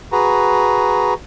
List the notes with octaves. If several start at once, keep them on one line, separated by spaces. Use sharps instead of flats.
F#4 G#4 B4 A#5